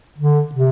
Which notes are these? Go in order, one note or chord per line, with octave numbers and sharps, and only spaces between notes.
D3
C3